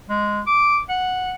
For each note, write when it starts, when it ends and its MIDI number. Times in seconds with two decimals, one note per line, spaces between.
0.10 0.41 56
0.47 0.79 86
0.89 1.35 78